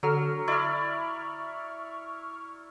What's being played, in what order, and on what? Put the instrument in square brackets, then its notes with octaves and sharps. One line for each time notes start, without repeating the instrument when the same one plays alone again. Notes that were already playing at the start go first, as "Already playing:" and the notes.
[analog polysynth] D3 A4 F6 [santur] F#3
[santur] E4 D5 [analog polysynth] C#6 F6